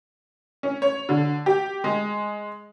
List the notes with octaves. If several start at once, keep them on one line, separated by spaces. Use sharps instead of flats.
C#4
C#5
D3
G4
G#3